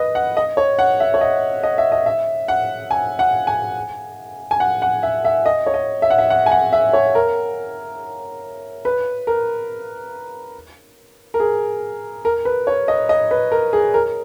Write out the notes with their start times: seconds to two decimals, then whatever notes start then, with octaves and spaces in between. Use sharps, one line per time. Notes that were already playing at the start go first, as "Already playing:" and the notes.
Already playing: B4 D#5
0.15 F#5
0.37 D#5
0.57 C#5
0.79 F#5
1.00 E5
1.14 C#5
1.21 D#5
1.63 D#5
1.78 E5
1.92 D#5
2.06 E5
2.48 F#5
2.91 G#5
3.19 F#5
3.47 G#5
4.51 G#5
4.60 F#5
4.82 F#5
5.03 E5
5.25 E5
5.46 D#5
5.66 C#5
5.74 D#5
6.02 E5
6.10 F#5
6.18 E5
6.30 F#5
6.46 G#5
6.51 F#5
6.73 E5
6.93 C#5
7.15 A#4
8.85 B4
9.27 A#4
11.34 A#4
11.40 G#4
12.25 A#4
12.45 B4
12.67 C#5
12.88 D#5
13.09 D#5
13.31 B4
13.52 A#4
13.73 G#4
13.94 A#4